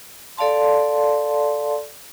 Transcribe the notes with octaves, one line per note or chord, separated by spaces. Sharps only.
A4 D5 F5 A5 C6